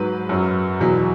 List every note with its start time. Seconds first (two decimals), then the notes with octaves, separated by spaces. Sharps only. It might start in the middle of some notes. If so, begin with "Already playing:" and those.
Already playing: G#2 F#3 B4
0.29 F#2 F#3
0.80 E2 B2 F#3